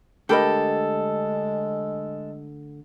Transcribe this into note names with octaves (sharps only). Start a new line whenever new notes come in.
D3 G#3 A3 G4 A4 A#4 D#5 B5